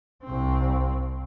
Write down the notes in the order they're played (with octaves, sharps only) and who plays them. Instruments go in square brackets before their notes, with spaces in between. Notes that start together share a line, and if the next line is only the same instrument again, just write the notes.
[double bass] C2 C4